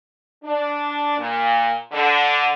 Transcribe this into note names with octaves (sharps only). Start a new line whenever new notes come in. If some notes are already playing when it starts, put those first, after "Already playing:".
D4
A#2
D3